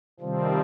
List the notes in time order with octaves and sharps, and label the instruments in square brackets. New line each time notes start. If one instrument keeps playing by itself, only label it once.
[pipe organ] C3 D#3 G3 C4 [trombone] F3